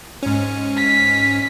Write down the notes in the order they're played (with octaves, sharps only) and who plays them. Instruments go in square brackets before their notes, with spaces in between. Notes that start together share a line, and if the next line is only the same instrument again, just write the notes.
[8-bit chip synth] G#2 C#4
[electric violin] B6